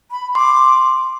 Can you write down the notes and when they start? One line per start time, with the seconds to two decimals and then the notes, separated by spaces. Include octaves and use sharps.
0.11 B5
0.35 C6 D6